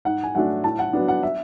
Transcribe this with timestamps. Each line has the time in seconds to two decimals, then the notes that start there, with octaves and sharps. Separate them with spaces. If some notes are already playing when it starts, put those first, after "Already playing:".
0.05 G#2 F#5
0.24 G#5
0.35 F#3 A3 D4 F#5
0.64 A2 A5
0.79 F#5
0.93 F#3 B3 D4
1.08 F#5
1.23 E5